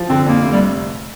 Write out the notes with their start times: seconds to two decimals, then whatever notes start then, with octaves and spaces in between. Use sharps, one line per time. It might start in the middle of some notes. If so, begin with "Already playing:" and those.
Already playing: F3
0.09 D3 C4
0.26 F2 A#3
0.43 F1
0.52 G3